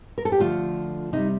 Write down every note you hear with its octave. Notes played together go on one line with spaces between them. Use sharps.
A#4
A4
G4
D3 F3 A3 F4
C3 G3 D#4